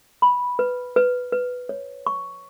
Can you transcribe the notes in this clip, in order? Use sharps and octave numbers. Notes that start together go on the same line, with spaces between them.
B5
B4
B4
B4
C#5
C#6